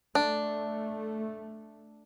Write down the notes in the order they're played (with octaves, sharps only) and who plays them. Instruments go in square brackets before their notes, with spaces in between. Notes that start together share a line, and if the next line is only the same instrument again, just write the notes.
[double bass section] A3 [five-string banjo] D4